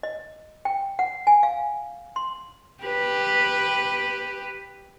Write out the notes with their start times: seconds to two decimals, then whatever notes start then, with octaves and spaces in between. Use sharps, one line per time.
0.03 D#5
0.65 G5
0.99 F#5
1.27 G#5
1.43 F5
2.16 C6
2.83 G4 B4